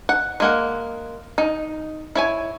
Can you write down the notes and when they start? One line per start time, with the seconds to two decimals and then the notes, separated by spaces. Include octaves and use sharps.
0.09 F#5
0.40 G#3 A#3 F#5
1.38 D#4
2.15 E4 C#5 G#5